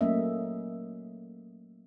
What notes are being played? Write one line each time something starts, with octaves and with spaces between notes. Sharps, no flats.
F#3 A3 A#3 C#4 D#5 E5